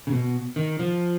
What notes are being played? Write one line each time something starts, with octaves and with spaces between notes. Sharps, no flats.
C#3
B2
D#3
F3